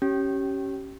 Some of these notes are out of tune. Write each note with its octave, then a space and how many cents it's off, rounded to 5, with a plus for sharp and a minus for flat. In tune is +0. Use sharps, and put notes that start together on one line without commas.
C#4 -5 G4 -30